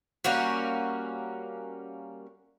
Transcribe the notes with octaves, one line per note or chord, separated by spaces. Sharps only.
G3 A#3 C#4 F#4